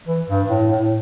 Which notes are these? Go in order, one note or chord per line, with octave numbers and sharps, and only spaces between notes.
E3
G2
A2
A2